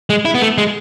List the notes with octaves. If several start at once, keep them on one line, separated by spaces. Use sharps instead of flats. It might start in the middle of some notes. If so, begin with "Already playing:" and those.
G#3
E4
B3
A3
G#3